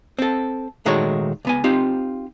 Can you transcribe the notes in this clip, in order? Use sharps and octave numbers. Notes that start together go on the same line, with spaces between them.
C4 A4
A#2 D#3 G#3 A3 F#4 C#5
C#2 B3 G#5
C4 D#4 F4 G4